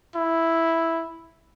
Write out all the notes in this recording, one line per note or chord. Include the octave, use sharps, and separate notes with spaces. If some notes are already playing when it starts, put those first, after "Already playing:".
E4